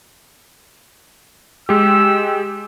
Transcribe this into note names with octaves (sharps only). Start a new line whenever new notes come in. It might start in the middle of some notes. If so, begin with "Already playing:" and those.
G#3 G4 E6